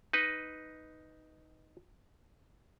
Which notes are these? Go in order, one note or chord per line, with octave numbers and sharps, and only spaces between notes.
D#4 B4 D#5